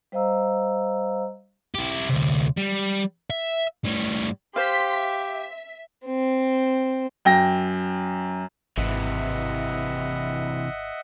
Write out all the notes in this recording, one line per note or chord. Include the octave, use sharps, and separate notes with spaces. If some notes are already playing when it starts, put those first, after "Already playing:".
G3 C5 D#5 F5 A#5 E6
E4 G4
D2 C3
G3
E5
A2 G3
G4 C5 F5 C6 B6
E5
C4
F#2 G5 A#6
G#1 C3 E3 D#5 E5 F#5